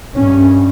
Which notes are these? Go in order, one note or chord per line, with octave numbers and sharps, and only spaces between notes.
G2 C#4